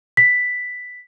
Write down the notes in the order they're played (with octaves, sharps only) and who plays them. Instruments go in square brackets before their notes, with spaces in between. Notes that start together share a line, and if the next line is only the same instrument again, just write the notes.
[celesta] B6